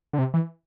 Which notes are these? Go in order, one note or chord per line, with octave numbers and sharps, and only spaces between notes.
D3
C3
E3